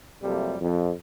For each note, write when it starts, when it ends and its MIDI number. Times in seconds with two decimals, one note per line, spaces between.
0.23 0.55 41
0.23 0.55 48
0.23 0.55 54
0.23 0.55 55
0.23 0.55 57
0.23 0.55 58
0.60 0.92 41